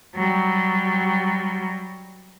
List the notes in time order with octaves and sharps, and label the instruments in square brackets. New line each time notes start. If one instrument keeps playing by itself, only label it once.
[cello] F#3 G3